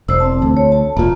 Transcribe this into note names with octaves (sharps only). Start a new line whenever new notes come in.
E1 C5 E6
C4 A5
D2
C#5
A5
E1 A#2 A#3 F4